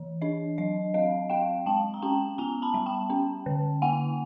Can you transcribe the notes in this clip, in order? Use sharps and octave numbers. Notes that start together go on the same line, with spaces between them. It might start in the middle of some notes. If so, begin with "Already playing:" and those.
Already playing: E3
D4 D#5
F#3 D#5
C4 D#5 F5
C4 F5 G5
G#3 G5 A5
A#5
C#4 G5 A5
B3 G#5 A#5
A5 B5
G3
G5 A5
C#4
D3
A#3 F#5 G#5